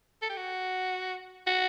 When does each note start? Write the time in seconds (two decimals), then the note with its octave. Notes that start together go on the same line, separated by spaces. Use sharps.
0.22 A4
0.29 G4
0.36 F#4
1.47 F#4